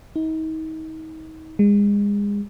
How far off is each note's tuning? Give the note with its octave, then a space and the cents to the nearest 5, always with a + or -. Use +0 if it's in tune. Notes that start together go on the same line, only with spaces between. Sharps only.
D#4 +35
G#3 -30